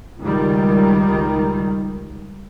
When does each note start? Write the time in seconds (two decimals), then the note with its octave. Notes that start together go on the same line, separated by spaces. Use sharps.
0.19 C#2 D#3 G3